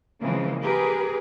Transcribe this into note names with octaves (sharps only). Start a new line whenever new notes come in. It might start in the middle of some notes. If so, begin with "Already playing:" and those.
C#3 E3 F3 G#3 A#3 C4
G4 G#4 A#4 B4